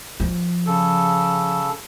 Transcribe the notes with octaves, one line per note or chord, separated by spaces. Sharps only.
F3
C#3 A4